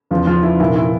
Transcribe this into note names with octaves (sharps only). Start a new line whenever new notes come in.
E2 C#3 F3 F4
F3 F4
E4
C2 A#2 F3 E4
E4